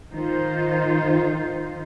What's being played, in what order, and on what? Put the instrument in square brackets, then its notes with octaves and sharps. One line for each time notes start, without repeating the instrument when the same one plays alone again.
[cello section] D#3 D#4 F4 C5